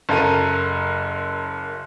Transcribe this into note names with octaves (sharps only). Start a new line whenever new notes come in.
F#1 F#2 A4 A#4 F6 D#7